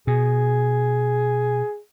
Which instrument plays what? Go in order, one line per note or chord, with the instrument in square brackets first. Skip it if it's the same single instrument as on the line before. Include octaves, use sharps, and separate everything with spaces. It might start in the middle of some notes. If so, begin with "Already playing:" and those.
[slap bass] B2 [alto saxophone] G#4